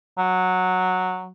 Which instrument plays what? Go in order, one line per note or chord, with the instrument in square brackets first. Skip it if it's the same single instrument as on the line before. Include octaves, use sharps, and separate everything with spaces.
[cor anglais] F#3